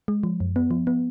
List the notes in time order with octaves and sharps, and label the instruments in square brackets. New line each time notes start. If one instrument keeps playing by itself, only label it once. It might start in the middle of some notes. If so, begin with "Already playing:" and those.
[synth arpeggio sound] G#3
F3
F#2
B3
F3
B3